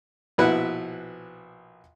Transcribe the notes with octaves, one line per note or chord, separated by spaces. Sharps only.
A#1 B2 E4 B4 F#5